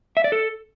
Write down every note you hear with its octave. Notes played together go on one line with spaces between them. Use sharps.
E5
D5
A4